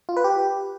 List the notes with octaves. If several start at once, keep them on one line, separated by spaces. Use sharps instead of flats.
F4
B4
G4